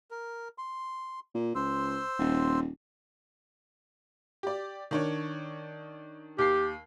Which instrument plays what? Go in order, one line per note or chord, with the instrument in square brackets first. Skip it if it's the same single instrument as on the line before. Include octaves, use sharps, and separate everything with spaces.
[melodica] A#4
C6
[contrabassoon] A#2
[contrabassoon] C#2 [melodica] C5 C6 E6
[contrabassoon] D#1
[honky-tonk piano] G4 D5
D#3 D4 C#5
[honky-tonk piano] D#2 C7 [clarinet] G4